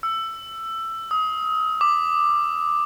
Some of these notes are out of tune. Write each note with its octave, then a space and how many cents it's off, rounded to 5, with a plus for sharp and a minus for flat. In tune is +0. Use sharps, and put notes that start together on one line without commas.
E6 +15
D#6 +30
D6 +15